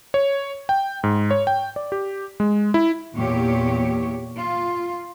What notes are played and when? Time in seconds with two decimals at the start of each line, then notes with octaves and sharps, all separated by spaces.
0.14 C#5
0.69 G5
1.04 G#2
1.31 C#5
1.47 G5
1.76 D5
1.92 G4
2.40 G#3
2.74 E4
3.16 E2 A#2 G4 C#5
4.38 F4